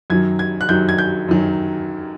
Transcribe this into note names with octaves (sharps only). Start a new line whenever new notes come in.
F#2 D#3 F#3 G#6
G#6
F#6
F#2 D#3 F#3 G6
G#6
G6
F#2 D#3 F#3